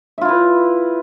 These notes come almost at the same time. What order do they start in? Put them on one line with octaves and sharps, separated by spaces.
E5 F4 E4 B4